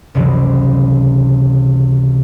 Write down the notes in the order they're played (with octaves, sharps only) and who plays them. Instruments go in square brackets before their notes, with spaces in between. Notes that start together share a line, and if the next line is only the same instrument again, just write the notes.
[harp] F#1 C#2 C3 E3 F#3